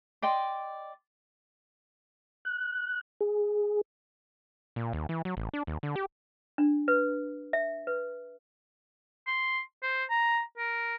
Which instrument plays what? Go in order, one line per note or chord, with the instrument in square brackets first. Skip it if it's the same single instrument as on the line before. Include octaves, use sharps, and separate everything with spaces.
[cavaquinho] D5 D#5 G5 C6
[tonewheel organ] F#6
G#4
[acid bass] A#2
D#2
E3
F#3
A1
D4
D#2
D3
G4
[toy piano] D4
B4
E5
B4
[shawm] C6
C5
A#5
A#4